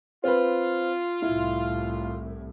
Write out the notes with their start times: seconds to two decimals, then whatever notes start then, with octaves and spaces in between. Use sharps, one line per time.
0.24 C4 F4 B4
1.22 C2 A2 E4